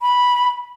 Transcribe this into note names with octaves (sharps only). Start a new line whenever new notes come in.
B5